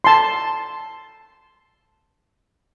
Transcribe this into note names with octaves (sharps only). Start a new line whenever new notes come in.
A5 C6